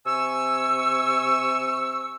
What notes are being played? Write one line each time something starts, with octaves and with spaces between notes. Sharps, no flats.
C3 G#5 C#6 E6